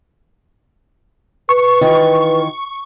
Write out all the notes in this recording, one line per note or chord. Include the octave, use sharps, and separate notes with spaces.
B4 C#6
D#3 E3 F4